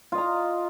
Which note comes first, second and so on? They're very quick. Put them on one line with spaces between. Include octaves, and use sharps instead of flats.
F4 D#5 A#5